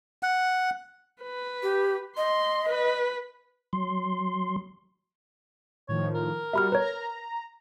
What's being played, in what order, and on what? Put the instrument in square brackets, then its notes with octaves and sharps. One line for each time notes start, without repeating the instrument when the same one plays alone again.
[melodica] F#5
[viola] B4
[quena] G4
[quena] D#5 [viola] C6
[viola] B4
[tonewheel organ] F#3 C6
[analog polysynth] A2 D#3 F3 [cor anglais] C#5
[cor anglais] A#4
[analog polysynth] G3 F#4 [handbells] E5 B5 F6
[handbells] B4 C#5 [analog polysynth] A#5